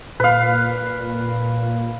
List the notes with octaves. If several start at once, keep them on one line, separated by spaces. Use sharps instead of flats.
A#2 B4 F5